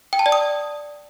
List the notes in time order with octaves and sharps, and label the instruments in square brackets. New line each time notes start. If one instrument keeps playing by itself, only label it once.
[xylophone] G5
A5
D5
D#6